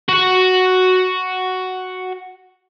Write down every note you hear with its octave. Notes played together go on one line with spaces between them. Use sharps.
F#4 F#5